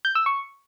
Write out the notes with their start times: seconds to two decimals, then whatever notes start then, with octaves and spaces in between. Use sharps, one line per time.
0.05 G6
0.15 E6
0.26 C#6